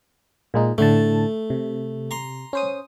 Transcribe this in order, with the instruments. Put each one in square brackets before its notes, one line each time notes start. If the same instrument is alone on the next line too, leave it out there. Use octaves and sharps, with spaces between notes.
[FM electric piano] A#2 G#3 D#4
[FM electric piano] A2 D3 A5 [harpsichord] A3
[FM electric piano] C3
[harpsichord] A#5 C6
[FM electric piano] C#4 C5 D#6